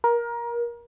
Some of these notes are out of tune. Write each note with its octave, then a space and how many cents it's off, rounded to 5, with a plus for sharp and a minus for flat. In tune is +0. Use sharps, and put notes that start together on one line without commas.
A#4 +20